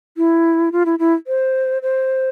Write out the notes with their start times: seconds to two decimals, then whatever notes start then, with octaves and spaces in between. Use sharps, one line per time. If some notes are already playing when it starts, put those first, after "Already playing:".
0.17 E4
0.72 F4
0.86 E4
0.99 E4
1.27 C5
1.82 C5